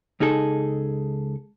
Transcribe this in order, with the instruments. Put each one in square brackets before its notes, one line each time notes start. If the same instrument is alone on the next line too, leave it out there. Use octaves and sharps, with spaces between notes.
[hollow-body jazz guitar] C#2 D#4 G#4 A4